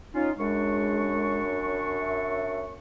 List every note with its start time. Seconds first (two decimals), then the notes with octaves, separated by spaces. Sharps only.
0.14 C#4 D#4 F4
0.38 F#2 G#3 D4 C#6
2.00 E5